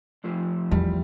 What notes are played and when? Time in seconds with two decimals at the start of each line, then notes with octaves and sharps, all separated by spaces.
0.24 F2 F3 A3
0.71 E2 G3